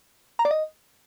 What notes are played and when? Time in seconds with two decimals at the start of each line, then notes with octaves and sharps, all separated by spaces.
0.39 A#5
0.45 D5
0.51 D#5